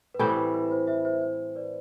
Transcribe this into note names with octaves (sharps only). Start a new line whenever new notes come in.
B4
A2 E3 G3 C4 C5
B4
B4
B4
C5
C5 E5
C5 E5
C5
B4 D5